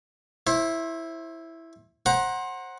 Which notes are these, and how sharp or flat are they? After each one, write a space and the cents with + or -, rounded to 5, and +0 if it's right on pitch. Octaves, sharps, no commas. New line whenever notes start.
E4 +0 C5 +30
C5 +25 F#5 +0 A#5 +25